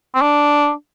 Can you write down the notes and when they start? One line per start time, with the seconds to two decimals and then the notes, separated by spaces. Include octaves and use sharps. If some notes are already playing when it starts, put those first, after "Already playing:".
0.14 C4
0.21 D4